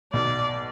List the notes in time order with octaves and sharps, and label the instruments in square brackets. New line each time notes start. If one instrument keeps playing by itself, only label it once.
[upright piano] B1 B2 [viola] D5